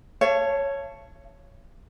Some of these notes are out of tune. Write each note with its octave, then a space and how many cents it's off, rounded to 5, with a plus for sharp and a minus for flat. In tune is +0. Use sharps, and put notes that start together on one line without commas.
C#5 +0 F5 -45 A5 +0